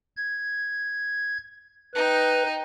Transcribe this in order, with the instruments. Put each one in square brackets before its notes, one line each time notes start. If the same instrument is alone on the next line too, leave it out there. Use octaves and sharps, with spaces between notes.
[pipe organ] G#6
[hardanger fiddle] D#4 G5 [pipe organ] B4